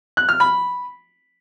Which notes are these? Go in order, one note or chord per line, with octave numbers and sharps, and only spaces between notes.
F#6
F6
B5